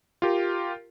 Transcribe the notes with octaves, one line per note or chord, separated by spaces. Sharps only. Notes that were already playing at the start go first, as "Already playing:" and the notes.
F4 G4 A#4